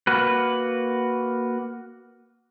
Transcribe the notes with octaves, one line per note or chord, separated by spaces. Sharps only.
A#3 F#4 B4